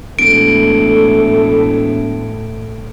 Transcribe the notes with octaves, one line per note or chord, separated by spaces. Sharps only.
E1 A2 A4 D7